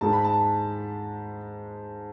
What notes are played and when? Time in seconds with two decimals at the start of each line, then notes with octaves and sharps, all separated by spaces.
0.01 G#2 G#3 A5
0.13 B5
0.24 A5